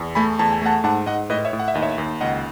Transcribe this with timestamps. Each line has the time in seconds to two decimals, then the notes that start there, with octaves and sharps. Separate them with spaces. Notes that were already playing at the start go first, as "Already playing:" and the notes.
Already playing: E2
0.15 A3 G#5 B5
0.39 E2 A5
0.52 G#5
0.62 A3 F#5 A5
0.84 G#2 F#5 A5
1.06 G#2 D#5 F#5
1.30 A2 B4 D#5
1.45 C#5 E5
1.53 A2
1.60 F#5
1.68 E5
1.74 D#2 D#5
1.82 C#5 E5
1.98 D#2
2.21 C#2 D#5 F#5